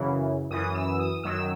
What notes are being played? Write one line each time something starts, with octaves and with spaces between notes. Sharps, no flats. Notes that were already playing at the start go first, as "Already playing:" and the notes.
Already playing: F#2 C#3 E3
F#2 E3 D#6
E6
D#6
F#2 D#3 F#3 E6